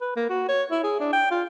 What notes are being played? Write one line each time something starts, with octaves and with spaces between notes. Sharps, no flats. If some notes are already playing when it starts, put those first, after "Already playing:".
B4
A#3
F#4
C#5
E4
G#4
D4
G5
F4